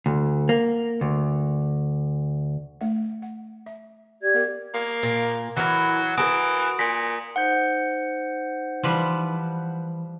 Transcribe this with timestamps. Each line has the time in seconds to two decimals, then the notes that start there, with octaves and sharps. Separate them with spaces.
0.06 D2
0.49 A#3
1.01 D2
2.81 A3 F5 F#5
3.22 F#5
3.66 E5
4.22 G4 D5 G#6
4.34 B3 A#4 F5
4.74 A#3
5.03 A#2
5.57 E3 F#3 A#4
6.17 E3 F#4 A4 A#4 D#6 D7
6.79 A#2 G#5 A#6 B6
7.36 D#4 C5 F#5 G6
8.84 E3 F3 G3 B4